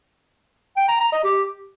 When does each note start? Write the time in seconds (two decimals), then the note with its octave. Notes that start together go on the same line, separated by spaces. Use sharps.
0.77 G5
0.89 A#5
1.00 A#5
1.12 D#5
1.24 G4